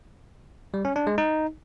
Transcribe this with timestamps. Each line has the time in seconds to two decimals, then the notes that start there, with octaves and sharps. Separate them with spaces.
0.74 G3
0.85 C#4
0.96 D4
1.07 G#3
1.18 D#4